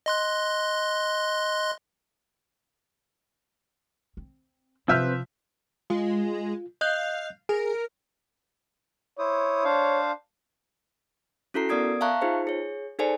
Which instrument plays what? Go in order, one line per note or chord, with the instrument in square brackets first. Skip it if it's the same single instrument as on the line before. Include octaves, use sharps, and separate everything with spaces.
[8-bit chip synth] D#5 C6 F#6
[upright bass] C4
[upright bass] C3 [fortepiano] F3 E5 F6 [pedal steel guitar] C4 B4 G6
[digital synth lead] G#3 [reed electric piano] F4
[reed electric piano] D#5 F#6 G6 [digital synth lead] F5
[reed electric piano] G#4 [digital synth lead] A#4
[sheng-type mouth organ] E4 C5 D#6 [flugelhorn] C#5
[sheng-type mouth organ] D4 C5 F5
[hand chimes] C#4 E4 F#4 A4 A#5 C7
B3 A#4 D5 D#6 G#6 D7
E5 F5 A5 A#5 C#6 F#6
D#4 F4 G#4 C5
G#4 C#5
D#4 G#4 A4 C5 D5 G#5